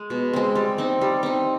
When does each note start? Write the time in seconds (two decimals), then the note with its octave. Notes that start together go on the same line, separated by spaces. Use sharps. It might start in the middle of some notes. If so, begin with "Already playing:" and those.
Already playing: G#3
0.10 B2
0.33 G#3 C4
0.55 G3
0.78 C4 D#4
1.01 G3
1.23 C4 D#4